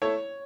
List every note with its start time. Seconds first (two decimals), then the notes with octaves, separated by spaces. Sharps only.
0.02 A3 E4 A4 C#5